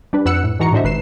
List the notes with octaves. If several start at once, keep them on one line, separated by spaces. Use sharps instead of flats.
G3 D4 B4
F2 B4 F#5 E6 F#6 C#7
A2
G#2 E3 F#4 A#5 C#6 C#7
A2 D3 F#4 C5 D#5 E5
G#1 B4 C7 E7